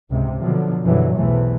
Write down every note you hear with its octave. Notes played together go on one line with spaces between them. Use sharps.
C#2 G#2 C3
B2 D3 F3 F#3
F#2 B2 D3 E3 F#3 G3
B1 E2 C3 E3 A3